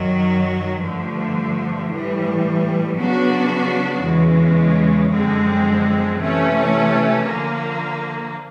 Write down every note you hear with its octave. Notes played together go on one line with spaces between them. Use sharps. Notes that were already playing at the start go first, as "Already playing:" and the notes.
Already playing: F#2 D#3 F#3
G2 D3 F3 A3
A2 E3 G3
C#3 F#3 B3 D4 F#4
E2 C#3 E3 G#3
F#2 D3 F3 G#3 C4
C3 E3 A3 C#4
D3 F3 A#3